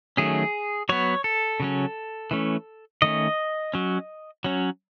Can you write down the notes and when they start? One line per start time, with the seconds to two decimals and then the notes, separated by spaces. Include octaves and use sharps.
0.17 D#3 F#3 A3 C#4 G#4
0.89 F#3 B3 C#5
1.24 A4
1.60 C#3 F#3 C#4
2.31 E3 A3 C#4
3.02 D#3 A3 C#4 D#5
3.74 F#3 C#4
4.44 F#3 C#4